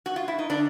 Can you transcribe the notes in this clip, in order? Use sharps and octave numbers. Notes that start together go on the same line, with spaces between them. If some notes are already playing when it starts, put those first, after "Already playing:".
F#4
F4
E4
D#4
D3 D4